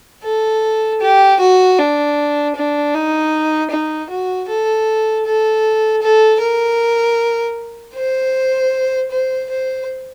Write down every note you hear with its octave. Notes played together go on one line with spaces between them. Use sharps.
A4
G4
F#4
D4
D4
D#4
D#4
F#4
A4
A4
A4
A#4
C5
C5
C5